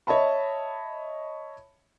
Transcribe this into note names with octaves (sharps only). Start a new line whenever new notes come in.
C#5 D#5 E5 A5 B5